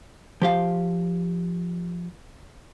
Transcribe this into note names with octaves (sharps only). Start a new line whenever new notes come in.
F3 G4 F5